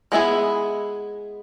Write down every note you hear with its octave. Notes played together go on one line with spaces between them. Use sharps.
G#3 B3 E4 G#4